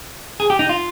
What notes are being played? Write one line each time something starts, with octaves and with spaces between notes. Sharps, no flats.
G#4
G4
D#4
F4